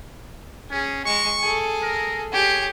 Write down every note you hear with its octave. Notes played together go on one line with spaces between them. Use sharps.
C#4 G#4
G#3 C#6
G#4 A4
A#4
G4 G#4 C#5